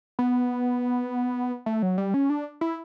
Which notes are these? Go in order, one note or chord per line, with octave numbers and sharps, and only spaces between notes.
B3
A3
F#3
G3
C#4
D4
E4